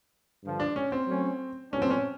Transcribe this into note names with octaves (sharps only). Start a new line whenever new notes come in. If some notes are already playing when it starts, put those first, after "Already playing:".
G2 D3 F3
D4
C#4
C4
F#3 A3 C#4
A#2 F#3 B3 C#4 D4
C4
C#4